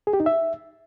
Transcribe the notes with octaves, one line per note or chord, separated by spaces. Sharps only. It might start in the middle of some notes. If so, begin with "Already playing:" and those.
G#4
G4
D#4
E5